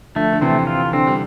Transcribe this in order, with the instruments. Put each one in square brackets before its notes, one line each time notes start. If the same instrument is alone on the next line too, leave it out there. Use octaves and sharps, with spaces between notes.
[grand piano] D3 F3 [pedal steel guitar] A3
[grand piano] D3
[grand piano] C3 E3 [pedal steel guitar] C4
[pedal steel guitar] F4
[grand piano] D3 [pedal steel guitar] C4
[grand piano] G3